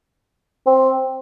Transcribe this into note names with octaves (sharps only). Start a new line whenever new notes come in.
C4